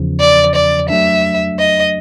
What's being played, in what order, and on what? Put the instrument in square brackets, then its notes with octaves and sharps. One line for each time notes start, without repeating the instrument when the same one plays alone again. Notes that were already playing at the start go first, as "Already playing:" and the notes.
Already playing: [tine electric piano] E2 C#3 F3
[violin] D5
D5
[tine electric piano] F#3 A3 D4 [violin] E5
[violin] D#5